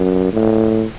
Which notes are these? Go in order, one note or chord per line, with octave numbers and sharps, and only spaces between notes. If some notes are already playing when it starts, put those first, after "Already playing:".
Already playing: F#2
A2